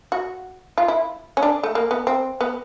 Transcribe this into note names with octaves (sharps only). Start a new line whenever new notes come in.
F#4
F4
E4
C#4
D4
A3
A#3
B3
C4
B3